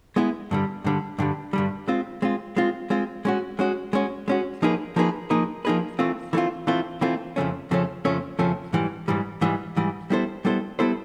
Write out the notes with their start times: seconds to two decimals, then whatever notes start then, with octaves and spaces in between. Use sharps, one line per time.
0.16 G#3 B3 E4
0.51 G2 D3 G3
0.84 G2 D3 G3
1.19 G2 D3 G3
1.53 G2 D3 G3
1.88 G#3 C4 F4
2.22 G#3 C4 F4
2.56 G#3 C4 F4
2.90 G#3 C4 F4
3.25 G#3 C#4 F#4
3.59 G#3 C#4 F#4
3.93 G#3 C#4 F#4
4.28 G#3 C#4 F#4
4.62 F3 A#3 D#4 G#4 B4
4.96 F3 A#3 D#4 G#4 B4
5.30 F3 A#3 D#4 G#4 B4
5.65 F3 A#3 D#4 G#4 B4
5.99 E3 A3 C4 F4
6.33 E3 A3 C4 F4
6.67 E3 A3 C4 F4
7.01 E3 A3 C4 F4
7.36 F2 C#3 F3 A3 C#4
7.71 F2 C#3 F3 A3 C#4
8.05 F2 C#3 F3 A3 C#4
8.39 F2 C#3 F3 A3 C#4
8.73 G#2 E3 G3
9.08 G#2 E3 G3
9.41 G#2 E3 G3
9.76 G#2 E3 G3
10.10 G3 B3 E4 A4 C5
10.45 G3 B3 E4 A4 C5
10.79 G3 B3 E4 A4 C5